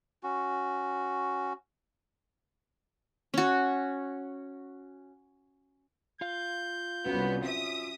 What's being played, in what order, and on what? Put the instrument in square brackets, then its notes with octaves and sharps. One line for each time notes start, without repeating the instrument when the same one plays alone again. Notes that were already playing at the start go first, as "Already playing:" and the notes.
[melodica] C#4 F#4
[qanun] C#4 F#4
[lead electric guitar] F4 F5 [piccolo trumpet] G6
[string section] C2 B3 [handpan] C#4 F#4
[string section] E5 D#6